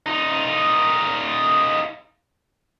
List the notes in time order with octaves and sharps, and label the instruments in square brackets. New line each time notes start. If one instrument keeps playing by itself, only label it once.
[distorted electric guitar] D#4 F4